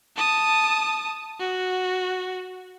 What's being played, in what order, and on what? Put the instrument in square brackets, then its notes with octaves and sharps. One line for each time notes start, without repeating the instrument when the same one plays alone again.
[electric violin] A5 D#6
F#4